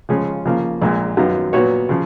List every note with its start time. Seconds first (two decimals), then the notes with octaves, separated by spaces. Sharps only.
0.09 C#3 F3 G#3 C#4 G#4
0.46 C#3 F3 A#3 F4
0.82 A#1 A#2 G#3
1.17 F#2 D#3 F#3 B3 F4
1.53 A#2 F#3 B3 F#4 C#5
1.89 C#3 F3